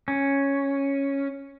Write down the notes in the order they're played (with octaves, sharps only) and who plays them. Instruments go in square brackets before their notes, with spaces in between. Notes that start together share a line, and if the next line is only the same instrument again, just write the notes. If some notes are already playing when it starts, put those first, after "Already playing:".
[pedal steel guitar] C#4